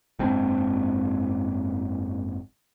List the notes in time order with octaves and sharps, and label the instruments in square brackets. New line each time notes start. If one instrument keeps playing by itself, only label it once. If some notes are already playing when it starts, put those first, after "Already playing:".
[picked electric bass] F#1 G#2 C4 D4